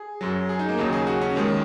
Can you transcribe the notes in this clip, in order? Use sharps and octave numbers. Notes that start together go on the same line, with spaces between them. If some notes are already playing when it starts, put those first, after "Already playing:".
Already playing: G#4
F#2 F#3
G#4
D#4
A#3
D#2 C#3 F#3 D#4
G#4
F#4
C#4
D#2 D#3 G#3